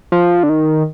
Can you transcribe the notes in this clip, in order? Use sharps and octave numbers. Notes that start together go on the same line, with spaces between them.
F3
D3
D#3